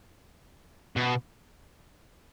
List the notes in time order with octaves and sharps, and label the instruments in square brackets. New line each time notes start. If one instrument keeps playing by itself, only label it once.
[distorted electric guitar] B2